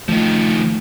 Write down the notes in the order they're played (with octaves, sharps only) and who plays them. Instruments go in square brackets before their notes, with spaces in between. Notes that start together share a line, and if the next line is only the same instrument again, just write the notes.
[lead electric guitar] D#3 F3 [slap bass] A3